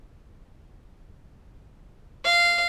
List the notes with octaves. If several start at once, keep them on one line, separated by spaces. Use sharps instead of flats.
F5